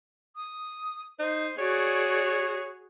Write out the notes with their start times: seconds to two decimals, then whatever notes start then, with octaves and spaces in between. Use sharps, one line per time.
0.36 D#6
1.19 D#4 C5
1.59 F#4 G#4 C#5 D5